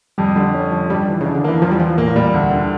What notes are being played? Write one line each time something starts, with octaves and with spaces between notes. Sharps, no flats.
F2 G3
D3 G3
C#4
F3
G2 G3
E3
C#3
D4
D3
E3 A#3
E2 F3
G3
E3 F3
A#2 A#3
A2
A#2 G3
D2
D3